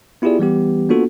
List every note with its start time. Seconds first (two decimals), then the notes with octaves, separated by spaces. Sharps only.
0.22 B3 E4 F4 G4 G#4 D5
0.39 E3 G3 B3 G4
0.89 A#3 B3 D4 F4 F#4 A4